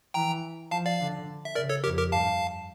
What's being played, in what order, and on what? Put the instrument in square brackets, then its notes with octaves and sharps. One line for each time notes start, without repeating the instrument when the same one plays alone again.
[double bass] E3 [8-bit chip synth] G5 A#5
[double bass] F3 [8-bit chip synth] F5 A5
[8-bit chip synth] D5 F5
[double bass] D3
[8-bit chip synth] E5
[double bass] C#3 [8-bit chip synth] A#4 D5
[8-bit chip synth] A4 C#5
[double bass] F2 [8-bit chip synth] G4 A#4
[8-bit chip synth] G4 A#4
[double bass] G2 [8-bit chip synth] F5 A5